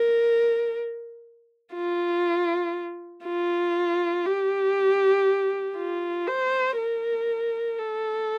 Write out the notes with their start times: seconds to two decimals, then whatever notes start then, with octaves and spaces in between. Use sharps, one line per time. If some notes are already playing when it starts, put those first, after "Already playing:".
Already playing: A#4
1.74 F4
3.25 F4
4.26 G4
5.77 F4
6.27 C5
6.77 A#4
7.79 A4